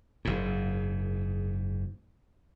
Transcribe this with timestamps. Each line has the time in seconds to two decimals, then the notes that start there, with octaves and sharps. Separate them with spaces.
0.25 F#1 G#2